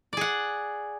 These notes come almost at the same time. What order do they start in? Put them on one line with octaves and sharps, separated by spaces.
D5 G#4 F#5